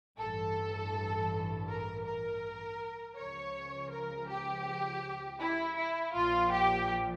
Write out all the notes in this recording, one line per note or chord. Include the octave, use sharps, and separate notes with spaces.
A1 G2 E3 A4
A#4
A#4
C#2 C#3 F3 C#5
A#4
G4
E4
E4
A#1 A#2 F3 F4
G4